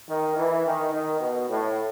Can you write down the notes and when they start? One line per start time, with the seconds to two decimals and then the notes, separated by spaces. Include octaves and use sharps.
0.08 D#3
0.36 E3
0.65 D#3
0.93 D#3
1.20 B2
1.49 A2